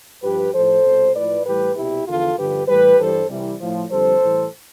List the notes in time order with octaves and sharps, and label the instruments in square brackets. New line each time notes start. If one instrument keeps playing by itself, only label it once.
[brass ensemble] G2 F3 G4 B4
A2 F3 A4 C5
C2 B2 G3
A2 F3 B4 D5
A2 E3 G3 G4 B4
C2 B2 G3 E4 G4
E2 D3 F3 F4 A4
G2 D3 F3 G4 B4
A2 E3 G3 G4 B4
G2 E3 G3 A4 C5
C2 C3 E3 G3
A2 F3
F2 D3 G3 A4 C5
A2 E3 G3